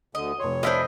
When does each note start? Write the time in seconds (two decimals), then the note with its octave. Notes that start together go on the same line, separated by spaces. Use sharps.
0.15 D2 D3 D#5
0.40 F1 C#5 C6
0.63 D4 E4 F4 C5 D#5